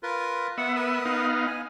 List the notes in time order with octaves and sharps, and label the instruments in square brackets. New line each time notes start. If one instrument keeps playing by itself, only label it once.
[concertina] F4 A#4 B4
[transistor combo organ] B3 E5 [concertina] F#5
[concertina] A#4 B4 D#6
[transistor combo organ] B3 D#4 F5
[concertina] G#5